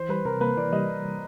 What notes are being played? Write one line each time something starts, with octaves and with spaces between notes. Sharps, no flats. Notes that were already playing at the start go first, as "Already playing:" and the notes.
Already playing: E3 C5
G3 B4
C3 A#4
A#3 B4
E3 D5
G3 D#5